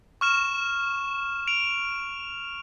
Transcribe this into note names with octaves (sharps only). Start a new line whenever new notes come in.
C#6 F6 E7
D7 F7